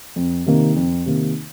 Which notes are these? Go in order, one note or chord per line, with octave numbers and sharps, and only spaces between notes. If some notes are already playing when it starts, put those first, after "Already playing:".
F2
C3 D#3 A#3
F2
C3 D#3 A#3